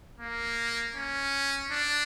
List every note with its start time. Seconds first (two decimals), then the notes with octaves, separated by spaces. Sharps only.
0.20 A#3
0.95 C#4
1.71 D4